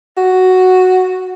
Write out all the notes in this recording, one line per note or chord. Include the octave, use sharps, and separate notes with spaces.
F#4